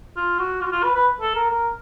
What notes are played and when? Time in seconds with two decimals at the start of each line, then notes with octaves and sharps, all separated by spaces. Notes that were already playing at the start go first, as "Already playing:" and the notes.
0.16 F4
0.39 F#4
0.61 F4
0.66 F#4
0.72 F4
0.84 B4
0.95 B4
1.21 A4
1.35 A#4
1.51 A#4